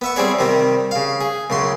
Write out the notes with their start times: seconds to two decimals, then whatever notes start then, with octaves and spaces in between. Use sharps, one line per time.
0.01 B3 E5 C#6
0.16 G3 C4 E4 G#4 C#5 D5
0.39 C3 D#3 G3 D#4
0.91 C#3 F5
1.21 G#4
1.50 C#2 F#2 C#3 C6